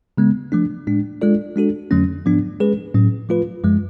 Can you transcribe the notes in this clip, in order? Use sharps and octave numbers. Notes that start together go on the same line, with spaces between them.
C#3 G#3 B3
F3 A3 D4
A2 G#3 D4
G#3 D4 F4 A4 D5
G#3 D4 F#4 A4
F2 D3 F#3 A3 C#4
G#2 F3 B3 D4
G#3 C#4 G#4 B4
A2 F#3 C#4
F3 A3 F4 B4
F#2 F3 G#3